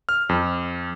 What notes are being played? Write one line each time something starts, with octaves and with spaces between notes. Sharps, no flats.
F6
F2